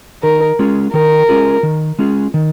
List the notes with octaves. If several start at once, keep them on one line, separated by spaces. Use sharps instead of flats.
D#3 A#4
G#3 C#4 F4 G#4
D#3 A#4
G#3 C#4 F4 G#4
D#3
G#3 C#4 F4 G#4
D#3